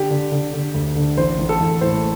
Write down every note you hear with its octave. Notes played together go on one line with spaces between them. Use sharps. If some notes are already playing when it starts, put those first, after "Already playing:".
Already playing: D3 G4
D3
D3
D3
D2
D3
A1 C5
A1
A4
A1
A2 C5